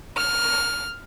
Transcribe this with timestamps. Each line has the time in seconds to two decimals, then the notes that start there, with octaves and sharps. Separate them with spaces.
0.16 F6